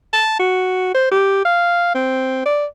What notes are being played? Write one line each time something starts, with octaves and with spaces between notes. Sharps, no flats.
A5
F#4
C5
G4
F5
C4
D5